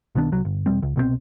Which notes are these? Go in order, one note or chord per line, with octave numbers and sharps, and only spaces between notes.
B1 D#3 B3 D4
C2 F#3
G1
E1 G3 C4
C#2
C2 B2 E3 C4